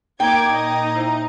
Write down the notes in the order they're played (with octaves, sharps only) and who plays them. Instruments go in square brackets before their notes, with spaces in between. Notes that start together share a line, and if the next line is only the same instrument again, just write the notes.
[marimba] A#3 A#4 [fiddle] D#4 [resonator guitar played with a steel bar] G5 [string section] D6 G#6
[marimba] A#2 [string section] D#5
[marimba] E4 C5 E5